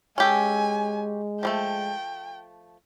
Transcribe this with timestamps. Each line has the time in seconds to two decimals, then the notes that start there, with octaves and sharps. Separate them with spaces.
0.18 G#3 C#4 G4 A4 G#5
1.43 F3 G3 A3 G5